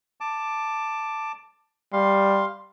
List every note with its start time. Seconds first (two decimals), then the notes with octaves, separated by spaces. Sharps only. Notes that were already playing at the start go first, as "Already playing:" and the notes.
0.20 A5 D6
1.93 G3 F5 C6